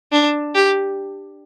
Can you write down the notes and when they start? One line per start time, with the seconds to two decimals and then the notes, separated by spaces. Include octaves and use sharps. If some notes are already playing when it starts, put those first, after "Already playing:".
0.12 D4
0.55 G4